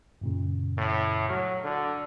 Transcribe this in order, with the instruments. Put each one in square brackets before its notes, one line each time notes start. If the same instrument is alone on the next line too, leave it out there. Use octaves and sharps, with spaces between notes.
[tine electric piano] F#2 A#2 C#3
[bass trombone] A2
[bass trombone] F#3 [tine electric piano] F6
[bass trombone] D3